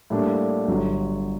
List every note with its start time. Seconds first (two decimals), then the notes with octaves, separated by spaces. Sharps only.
0.10 A2 G3 A#3 D4
0.68 G1 G2 F#3